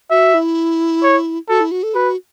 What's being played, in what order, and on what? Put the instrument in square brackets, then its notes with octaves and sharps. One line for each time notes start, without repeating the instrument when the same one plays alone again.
[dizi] F#4 [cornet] E5
[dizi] E4
[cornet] C#5
[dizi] F#4 [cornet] A4
[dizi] E4
F#4
A4
[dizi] F#4 [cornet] B4